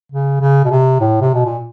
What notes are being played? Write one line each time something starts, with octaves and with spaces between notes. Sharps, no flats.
C#3
C#3
B2
C3
A2
C3
B2
A#2